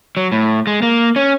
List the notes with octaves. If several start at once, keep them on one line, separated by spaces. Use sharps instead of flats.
F#3
A2
G#3
A#3
C#4